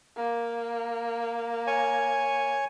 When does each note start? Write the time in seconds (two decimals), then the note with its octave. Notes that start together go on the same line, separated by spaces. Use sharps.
0.17 A#3
1.67 C#5 G#5